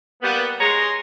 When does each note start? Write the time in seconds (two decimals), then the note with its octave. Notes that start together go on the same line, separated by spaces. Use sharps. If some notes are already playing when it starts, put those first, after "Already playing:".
0.23 G3 A#3 B3
0.61 G#3 G#4 C#5 A#5 C6